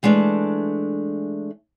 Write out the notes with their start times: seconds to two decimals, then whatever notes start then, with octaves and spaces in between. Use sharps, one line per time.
0.03 E3 G#3 A3 D4